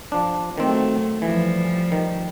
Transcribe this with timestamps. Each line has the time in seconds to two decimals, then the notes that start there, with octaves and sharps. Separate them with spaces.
0.12 F3 D4
0.58 D#3 F#3 A3 C4
1.22 E3 F3 G3
1.92 D#3